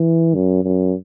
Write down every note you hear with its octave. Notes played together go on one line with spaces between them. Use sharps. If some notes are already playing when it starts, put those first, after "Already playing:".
Already playing: E3
F#2
F#2